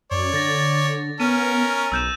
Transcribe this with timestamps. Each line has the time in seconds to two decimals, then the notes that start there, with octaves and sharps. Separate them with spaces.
0.11 F#2 C#5 D5
0.33 D3 A6 A#6
1.20 B3 C#4 A#4 D#7
1.92 B1 E6 G6 E7